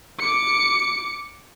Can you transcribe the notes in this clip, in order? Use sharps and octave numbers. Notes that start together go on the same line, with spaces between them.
D6 C#7